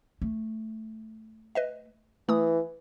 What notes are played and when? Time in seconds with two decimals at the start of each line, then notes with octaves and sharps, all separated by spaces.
0.22 A3
1.55 B4 D#5 E5
2.29 E3 A3 D#6